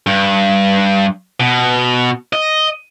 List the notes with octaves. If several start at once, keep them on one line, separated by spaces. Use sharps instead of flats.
G2
B2
D#5